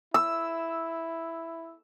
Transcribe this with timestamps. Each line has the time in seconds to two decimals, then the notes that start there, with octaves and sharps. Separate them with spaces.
0.14 E4 E6